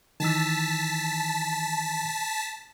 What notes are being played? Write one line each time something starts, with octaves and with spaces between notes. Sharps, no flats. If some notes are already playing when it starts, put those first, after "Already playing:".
D#3 E3 A5 E6 B6